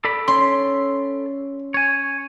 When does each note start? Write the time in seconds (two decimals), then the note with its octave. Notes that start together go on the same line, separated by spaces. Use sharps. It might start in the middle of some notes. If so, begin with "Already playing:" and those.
0.05 A4 D5 B5
0.28 C#4 C6
1.74 C#5 G#5